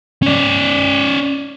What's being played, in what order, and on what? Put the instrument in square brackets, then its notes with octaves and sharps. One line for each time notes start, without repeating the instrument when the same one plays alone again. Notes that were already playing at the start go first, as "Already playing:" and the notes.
[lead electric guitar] C#4 D5